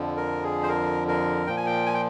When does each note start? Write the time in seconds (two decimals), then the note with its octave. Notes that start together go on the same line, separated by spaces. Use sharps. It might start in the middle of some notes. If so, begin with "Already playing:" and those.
Already playing: F2 D3 F3
0.17 A#4
0.44 G#4
0.63 C5
0.68 A#4
1.08 A#4
1.47 A#2 F3 G5
1.57 G#5
1.66 G5
1.86 G#5
1.94 G5